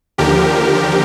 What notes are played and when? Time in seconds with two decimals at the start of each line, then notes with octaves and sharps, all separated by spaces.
0.18 D#2 D3 F3 G4 A#4